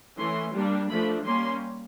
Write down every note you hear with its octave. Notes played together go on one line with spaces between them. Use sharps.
E3 A3 C#4 C6
G3 A#3 D4
F3 A3 D4 B5
G3 A#3 C#4 C6